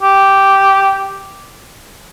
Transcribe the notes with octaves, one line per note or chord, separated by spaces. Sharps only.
G4